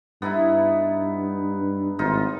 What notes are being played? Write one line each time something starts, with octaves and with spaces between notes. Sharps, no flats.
G2 B3 D#4 E4
G#1 D#4 F4